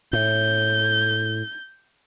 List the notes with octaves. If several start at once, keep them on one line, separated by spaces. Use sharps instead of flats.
A2 G6